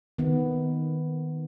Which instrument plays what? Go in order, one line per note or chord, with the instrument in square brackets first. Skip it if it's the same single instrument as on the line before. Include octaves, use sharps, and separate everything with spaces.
[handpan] D#3 B3